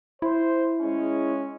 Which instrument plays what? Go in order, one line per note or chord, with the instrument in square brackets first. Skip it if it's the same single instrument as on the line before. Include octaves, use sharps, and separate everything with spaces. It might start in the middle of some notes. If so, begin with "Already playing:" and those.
[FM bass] E4 [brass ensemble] C5
[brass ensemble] G#3 C#4